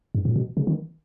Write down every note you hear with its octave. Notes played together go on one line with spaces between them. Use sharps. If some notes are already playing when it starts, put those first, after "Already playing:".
G2
A#2
B2
C#3
D#3